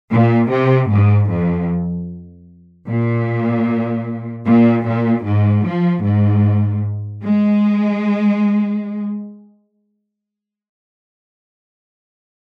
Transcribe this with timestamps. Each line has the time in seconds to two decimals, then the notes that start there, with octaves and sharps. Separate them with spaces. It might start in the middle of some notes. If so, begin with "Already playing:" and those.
0.11 A#2
0.50 C3
0.89 G#2
1.29 F2
2.88 A#2
4.46 A#2
4.86 A#2
5.25 G#2
5.65 F3
6.03 G#2
7.22 G#3